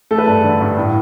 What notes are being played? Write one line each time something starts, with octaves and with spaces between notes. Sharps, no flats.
A3 A4
B4
G2 A5
D3
G2
A2